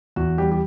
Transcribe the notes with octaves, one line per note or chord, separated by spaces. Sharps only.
E2 F#4
G3 G4
G4